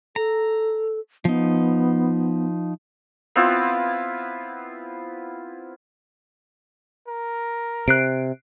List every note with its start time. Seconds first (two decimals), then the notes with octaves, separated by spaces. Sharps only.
0.16 A4 A#5
1.25 F3 B3 D#4
3.36 B3 C4 E4 F4
7.08 A#4
7.88 C3 F#6 C7 D7